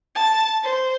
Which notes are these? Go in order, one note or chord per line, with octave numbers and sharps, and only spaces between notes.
A5
C5